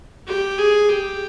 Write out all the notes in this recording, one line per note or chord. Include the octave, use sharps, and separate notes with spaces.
G4
G#4
G4